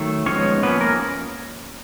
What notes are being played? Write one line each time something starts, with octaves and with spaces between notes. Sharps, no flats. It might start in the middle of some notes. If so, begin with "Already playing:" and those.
Already playing: D#3 F#3 A3
F3 G#3 B3 C#4 D#4 C#5
F3 A#3 B3 C#4 B4
A#3 A#4